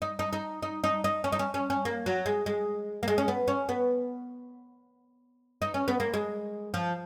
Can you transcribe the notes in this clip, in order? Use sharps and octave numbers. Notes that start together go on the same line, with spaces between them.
D#4
D#4
D#4
D#4
D#4
D#4
C#4
D#4
C#4
C#4
C#4
A#3
F#3
G#3
G#3
A#3
G#3
C#4
B3
C#4
B3
D#4
C#4
B3
A#3
G#3
F3